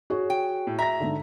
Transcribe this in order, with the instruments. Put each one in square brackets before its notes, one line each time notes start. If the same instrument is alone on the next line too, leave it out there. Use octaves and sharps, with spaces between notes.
[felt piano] F#4 G#4 C#5
[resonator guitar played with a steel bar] G5
[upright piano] A2
[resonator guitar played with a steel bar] E5 [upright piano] A#5 A#6
[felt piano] G#2 D3